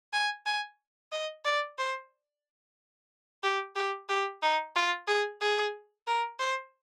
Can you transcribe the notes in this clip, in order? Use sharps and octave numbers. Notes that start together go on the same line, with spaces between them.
G#5
G#5
D#5
D5
C5
G4
G4
G4
D#4
F4
G#4
G#4
A#4
C5